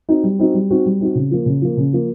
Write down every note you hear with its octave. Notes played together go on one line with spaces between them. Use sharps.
C4 D#4 F#4
G3
C4 D#4 F#4
G3
C4 D#4 F#4
G3
C4 D#4 F#4
C#3
F3 A#3
C#3
F3 A#3
C#3
F3 A#3